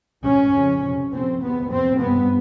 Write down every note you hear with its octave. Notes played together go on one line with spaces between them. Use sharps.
G#2 C#4
F2 C#3
F2 C3
F2 C3 C4
E2 C3 B3
F2 C3 C4
G2 B3